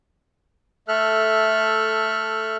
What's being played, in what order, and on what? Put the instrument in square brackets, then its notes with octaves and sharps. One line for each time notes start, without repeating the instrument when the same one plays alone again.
[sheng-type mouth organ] A3 A4 E5 F6 F#6